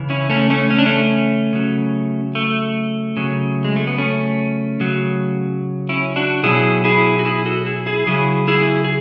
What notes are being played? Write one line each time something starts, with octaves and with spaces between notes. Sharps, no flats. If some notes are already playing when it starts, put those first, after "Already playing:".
Already playing: C#3 E3
C#4 E4
A3 C#4
A3 C#4
C#4
D4
A3 C#4
C#3 F#3
A3
C#3 F#3
G#3
A3
B3
A3 C#4
C#3 F#3
C#4 E4
D4 F#4
B2 F#3 E4 G#4
E4 G#4
F#4
E4 G#4
F#4 A4
E4 G#4
E4 G#4
C#3 F#3 E4 G#4
E4 G#4
G#4